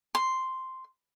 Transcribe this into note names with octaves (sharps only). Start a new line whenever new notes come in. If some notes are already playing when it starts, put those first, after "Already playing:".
C6